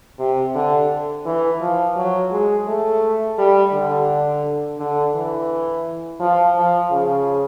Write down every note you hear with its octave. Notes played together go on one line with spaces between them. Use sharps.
C3
D3
E3
F3
F#3
G#3
A3
G3
D3
D3
E3
F3
F3
C#3